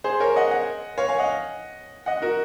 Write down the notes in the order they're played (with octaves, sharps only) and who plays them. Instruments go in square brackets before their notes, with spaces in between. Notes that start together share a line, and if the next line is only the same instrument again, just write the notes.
[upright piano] G#4 C5
A#4 C#5
D#5 F#5
D#5 F#5
C#5 F5
F5 G#5
D#5 F#5
D#5 F#5
F#4 A#4